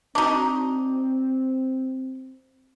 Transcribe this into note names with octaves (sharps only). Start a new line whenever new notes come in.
C4 D4 D#4 F#4 C#6 D6